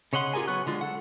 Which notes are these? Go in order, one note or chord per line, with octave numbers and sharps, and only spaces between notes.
C#3 C#5 D#5 F#5 C6
F4 G4 G#4 A#4 G#5
F#3 B3 C#6 F#6
D3 G#3 F4
A4 F#5